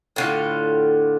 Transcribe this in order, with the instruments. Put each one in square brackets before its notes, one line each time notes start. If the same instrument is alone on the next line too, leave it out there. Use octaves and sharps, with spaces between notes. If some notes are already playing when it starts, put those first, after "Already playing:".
[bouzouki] A2 D3 F4